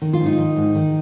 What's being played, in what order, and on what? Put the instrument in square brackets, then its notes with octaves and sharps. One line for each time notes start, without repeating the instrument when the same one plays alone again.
[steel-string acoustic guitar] D#3
F4
G#2
D#4
D#3
G#2
D#3